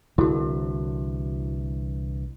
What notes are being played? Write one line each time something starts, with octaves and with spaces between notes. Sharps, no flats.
C2 D3 E3 E4 F#4